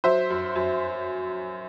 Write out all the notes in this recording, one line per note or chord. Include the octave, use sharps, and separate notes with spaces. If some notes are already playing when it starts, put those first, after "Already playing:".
F#3 C5 E5
F#2
F#2